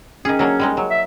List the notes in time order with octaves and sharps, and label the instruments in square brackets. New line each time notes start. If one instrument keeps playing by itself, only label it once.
[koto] D#3 G#4 [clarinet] C#4
[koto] F#3 A#3 D4
G3 G#3 D#4
F#3
[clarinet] E5